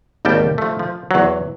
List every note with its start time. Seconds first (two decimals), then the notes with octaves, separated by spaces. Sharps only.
0.25 G#1 D#2 G3 G5 A5
0.58 F3 A3
0.79 F3
1.11 E2 F#3